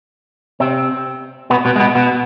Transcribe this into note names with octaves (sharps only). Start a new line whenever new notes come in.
C3 C4
B2 B3
B2 B3
G#3
B2 B3
B2 B3